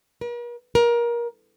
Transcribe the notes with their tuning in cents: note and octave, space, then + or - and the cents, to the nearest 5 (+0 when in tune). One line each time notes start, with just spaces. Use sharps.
A#4 +45
A#4 +25